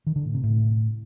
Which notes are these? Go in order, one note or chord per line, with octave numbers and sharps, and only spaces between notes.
D#3
D3
A2
C3
A2